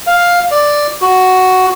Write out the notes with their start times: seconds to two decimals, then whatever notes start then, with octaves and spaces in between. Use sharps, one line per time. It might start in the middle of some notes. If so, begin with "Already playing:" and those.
0.07 F5
0.51 D5
1.02 F#4